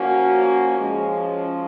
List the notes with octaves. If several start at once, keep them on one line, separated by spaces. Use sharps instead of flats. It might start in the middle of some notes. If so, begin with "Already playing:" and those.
Already playing: A#2 F3 A#3 C#4 F#4
F3 G#3 C#4